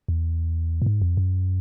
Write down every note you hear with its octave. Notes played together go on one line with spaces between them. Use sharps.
E2
A2
G#2
F2
F#2